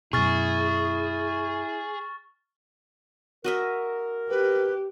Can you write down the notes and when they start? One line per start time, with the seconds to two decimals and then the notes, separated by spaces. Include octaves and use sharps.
0.13 F#2 B2 E4 G#4 C#6 F6 A6
3.44 F#4 A#4 D#5 E5
4.30 G4 B4